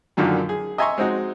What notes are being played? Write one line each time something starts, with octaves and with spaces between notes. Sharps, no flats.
A#1 F#2 A#2 D3 D#3 F#3
G#4
D#5 E5 G#5 A#5 C6 C#6
G#3 C4 D#4 F#4